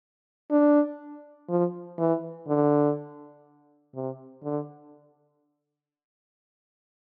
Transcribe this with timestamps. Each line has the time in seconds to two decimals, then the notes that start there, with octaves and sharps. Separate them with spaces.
0.51 D4
1.49 F3
1.98 E3
2.48 D3
3.95 C3
4.43 D3